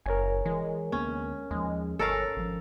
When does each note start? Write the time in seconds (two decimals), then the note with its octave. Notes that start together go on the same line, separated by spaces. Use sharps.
0.06 F#1 A#4 C#5 G#5
0.45 E3 G#3
0.92 D2 A#3 B3 C#4
1.51 D#2 F3 G#3
1.99 G1 C#4 A4 A#4 F5
2.36 G#1 F3